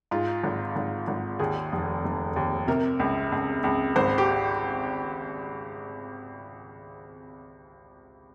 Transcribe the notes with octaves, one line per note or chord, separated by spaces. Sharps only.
G#2 F4
G#1
G#1
G#1
D#2 G#4
F1
F1
D#2
C3 A#4
C#2
C#2
C#2
G#1 C5
G4